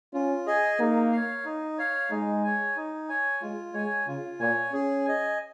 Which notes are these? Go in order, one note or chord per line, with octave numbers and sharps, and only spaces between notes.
C#4 F4
G#4 D#5 G#5
A#3 D#4
C#5 F5
D#4
C#5 F5
G#3 D#4
C#5 G#5
D#4
C#5 G#5
G#3 F4
G#3 C#5 G#5
C#3 F4
A#2 C#5 G#5
C#4 G#4
D#5 G#5